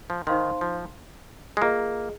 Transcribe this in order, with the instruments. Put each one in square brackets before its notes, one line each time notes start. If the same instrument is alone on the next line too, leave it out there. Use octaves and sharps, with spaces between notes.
[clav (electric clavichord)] F3
[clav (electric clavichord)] D#3 [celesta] D#4 C5 F5 C6
[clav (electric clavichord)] F3
G#3
[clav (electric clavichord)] A#3 [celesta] F4 G#4 D#5